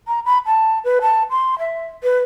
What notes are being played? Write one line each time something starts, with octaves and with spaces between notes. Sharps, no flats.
A#5
B5
A5
B4
A5
C6
E5
B4